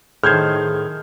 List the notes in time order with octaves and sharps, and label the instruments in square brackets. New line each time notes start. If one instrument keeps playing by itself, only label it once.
[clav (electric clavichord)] A2 C5 [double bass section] D#3 [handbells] G#4 [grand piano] F6 G6 G#6